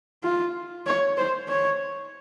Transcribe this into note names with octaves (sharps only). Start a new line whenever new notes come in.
F4
C#5
C5
C#5